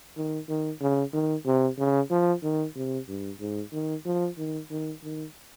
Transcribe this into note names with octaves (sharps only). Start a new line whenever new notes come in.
D#3
D#3
C#3
D#3
C3
C#3
F3
D#3
C3
G2
G#2
D#3
F3
D#3
D#3
D#3